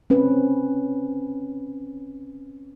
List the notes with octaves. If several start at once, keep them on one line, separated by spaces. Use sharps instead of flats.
C4 C#4 B4